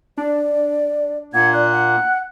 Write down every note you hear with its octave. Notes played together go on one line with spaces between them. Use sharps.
D4 D5
A#2 A#3 F#5 G#6
D5 F#6
F#5